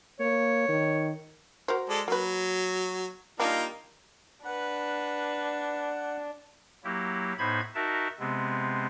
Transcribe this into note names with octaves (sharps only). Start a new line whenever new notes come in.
A#3 C#5
D#3
F#4 A#4 C5
G#3 A4 D5
F#3 A#3 B4
G3 A#3 D4 D#4 F4
D4 B4 F#5
F#3 A#3 E4 G4
A2 B3 D#4 C5 B5 G#6
D#4 F#4 A#4 E5 A5
C3 G#3 B3 C4